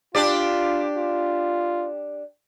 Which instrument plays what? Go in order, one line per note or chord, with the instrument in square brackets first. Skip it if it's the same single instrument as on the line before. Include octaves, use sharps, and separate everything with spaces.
[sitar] D4 G4 D5 [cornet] F4
[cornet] F4